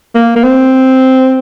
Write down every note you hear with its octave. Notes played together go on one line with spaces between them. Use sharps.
A#3
A#3
C4